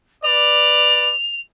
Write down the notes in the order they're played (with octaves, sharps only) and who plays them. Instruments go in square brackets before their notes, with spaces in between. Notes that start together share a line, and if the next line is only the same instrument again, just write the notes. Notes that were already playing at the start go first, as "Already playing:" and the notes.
[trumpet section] B4 D5 [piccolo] F7